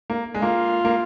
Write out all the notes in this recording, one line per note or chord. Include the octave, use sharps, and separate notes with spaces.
A#3
G#3
A#3 F4
A#3